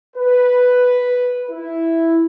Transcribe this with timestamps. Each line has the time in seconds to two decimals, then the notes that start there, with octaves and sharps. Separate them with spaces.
0.17 B4
1.51 E4